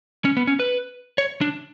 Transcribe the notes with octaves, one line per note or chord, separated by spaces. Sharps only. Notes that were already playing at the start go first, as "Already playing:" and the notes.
C#4
B3
C#4
B4
C#5
D4